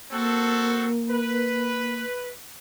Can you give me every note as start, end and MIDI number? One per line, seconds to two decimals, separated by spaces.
0.11 2.04 58
0.11 0.87 60
0.11 0.87 66
0.11 0.87 69
1.09 2.30 71